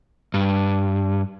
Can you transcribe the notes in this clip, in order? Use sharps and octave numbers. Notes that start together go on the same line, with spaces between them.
G2